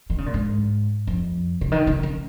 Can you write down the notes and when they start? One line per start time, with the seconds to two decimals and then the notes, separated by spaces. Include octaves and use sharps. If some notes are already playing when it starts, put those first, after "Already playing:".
0.10 D#3
0.18 C#3
0.26 A#2
0.34 G#2
1.07 F2
1.61 C#3
1.72 D#3
1.87 C#3
2.03 C#3